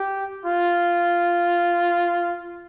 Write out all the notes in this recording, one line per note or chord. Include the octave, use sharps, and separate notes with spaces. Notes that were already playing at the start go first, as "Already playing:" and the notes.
Already playing: G4
F4